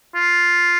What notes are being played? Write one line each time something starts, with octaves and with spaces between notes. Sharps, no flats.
F4